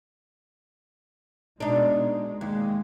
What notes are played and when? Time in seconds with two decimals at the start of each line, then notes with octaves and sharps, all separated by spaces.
1.60 B2 G#3 D4 D#4
2.41 D#2 G#3